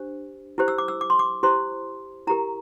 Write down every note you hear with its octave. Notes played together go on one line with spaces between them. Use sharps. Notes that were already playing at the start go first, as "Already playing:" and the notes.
Already playing: D4 G4 C5
E4 G4 C5
E6
D6
E6
D6
C6
D6
E4 G4 C5 C6
E4 G4 A#4 A#5